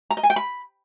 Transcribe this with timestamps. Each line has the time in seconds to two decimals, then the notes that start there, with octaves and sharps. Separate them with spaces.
0.10 A#5
0.17 D#5
0.23 G#5
0.30 G5
0.36 B5